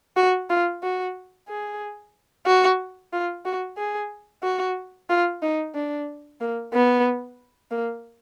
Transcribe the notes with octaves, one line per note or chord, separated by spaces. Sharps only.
F#4
F4
F#4
G#4
F#4
F4
F#4
G#4
F#4
F4
D#4
D4
A#3
B3
A#3